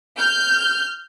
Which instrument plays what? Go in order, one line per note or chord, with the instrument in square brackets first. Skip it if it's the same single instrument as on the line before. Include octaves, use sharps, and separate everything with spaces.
[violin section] F6 G6